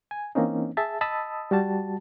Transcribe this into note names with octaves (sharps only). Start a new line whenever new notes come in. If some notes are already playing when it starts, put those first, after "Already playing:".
G#5
E3 A#3 C4 C#4 D#4
G#4 E5 A5
D#5 A5 B5 D#6 E6
G3 F#4 A5